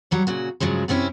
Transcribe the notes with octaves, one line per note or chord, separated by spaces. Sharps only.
F#3 G3 C#5
A#2 C#3 F#4
G2 C#3 F3 F#3 G#3
F#2 C3 C4 C#4 E4